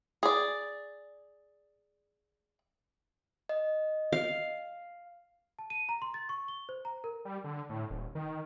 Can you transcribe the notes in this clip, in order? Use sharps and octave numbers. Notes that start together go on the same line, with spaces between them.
G#4 D5
D#5
F5
A5
D#7
A#5
C6
A6
C#6
G7
C5
A#5
A#4
G3
D3
A2
D#1
D#3